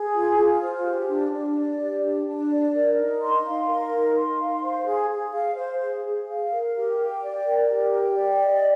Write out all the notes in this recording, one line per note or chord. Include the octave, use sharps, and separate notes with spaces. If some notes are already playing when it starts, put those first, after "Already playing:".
Already playing: G#4
F4
F4
C5
G4
D4
D4
D5
G4
D4
D4
D5
A#4
D#4
C6
F5
A#4
D#4
C6
F5
C5
G#4
G#4
F5
C5
G#4
G#4
F5
A#4
G4
G5
D5
A#4
G4
G5
D5
D#5